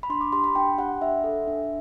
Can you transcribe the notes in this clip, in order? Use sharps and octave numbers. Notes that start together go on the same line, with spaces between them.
B5
D4 C6
D6
G4 C6
B5
D4 G5
G4 F#5
D4 E5
A4
D4